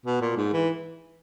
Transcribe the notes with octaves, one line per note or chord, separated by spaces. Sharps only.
B2
A#2
G#2
E3